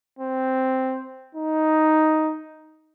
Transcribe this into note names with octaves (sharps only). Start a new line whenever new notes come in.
C4
D#4